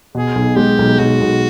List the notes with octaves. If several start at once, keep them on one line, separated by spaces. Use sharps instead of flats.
B2 G#4
B1
G#3 G4
B1
B1 F#4
B1